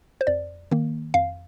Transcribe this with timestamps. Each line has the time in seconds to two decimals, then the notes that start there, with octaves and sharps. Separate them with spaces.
0.21 C5
0.27 F2 D5
0.71 D#3 A#3
1.14 F2 F5